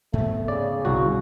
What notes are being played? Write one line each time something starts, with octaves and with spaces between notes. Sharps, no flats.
G#2 A3 B3
C#3 D5
G1 C2 F#4